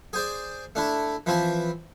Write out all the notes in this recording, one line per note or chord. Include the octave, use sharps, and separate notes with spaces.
G#4 C5 D5
A3 D4 E4
E3 F3 C4 E4